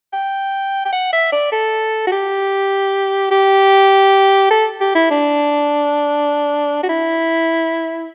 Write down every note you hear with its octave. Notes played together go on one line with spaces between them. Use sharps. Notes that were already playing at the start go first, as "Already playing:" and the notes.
G5
G5
F#5
E5
D5
A4
F#4
G4
G4
A4
G4
E4
D4
F#4
E4